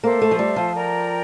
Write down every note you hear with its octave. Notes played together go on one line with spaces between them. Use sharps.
A#3 A4 C5 E5
A3
F3
G3
F3
A#4 D5 G5 A#5